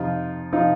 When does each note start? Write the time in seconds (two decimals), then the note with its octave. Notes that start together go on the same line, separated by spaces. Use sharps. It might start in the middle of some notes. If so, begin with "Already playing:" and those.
Already playing: F2 C3 F3 D#4 F4
0.53 C3 F3 D#4 F4